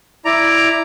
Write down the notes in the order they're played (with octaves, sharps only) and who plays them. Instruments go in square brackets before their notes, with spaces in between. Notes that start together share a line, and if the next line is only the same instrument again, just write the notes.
[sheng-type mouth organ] E4 D5 A#5